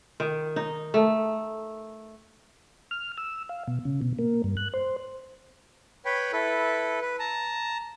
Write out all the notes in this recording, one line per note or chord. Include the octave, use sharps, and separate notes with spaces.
D#3
D#4
A3
F6
E6
F5
B2
C#3
B2
A#3
G2
F#6
C5
B4 C#5 G5 B5
E4 A4 B4
B4
A5 A#5